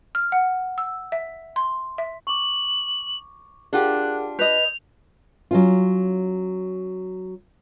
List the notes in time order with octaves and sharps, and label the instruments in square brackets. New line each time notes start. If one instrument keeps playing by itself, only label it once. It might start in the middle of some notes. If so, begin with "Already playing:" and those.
[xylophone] F6
F#5
E6
E5
C6
E5
[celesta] C#6 D6 [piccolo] F#7
[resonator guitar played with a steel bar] D4 F4 G4 [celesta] G#4 A#4 F#5 [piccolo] F#6
[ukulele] B4 D#5 [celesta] G6 [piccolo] F7
[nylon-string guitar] F#3 C#4 F4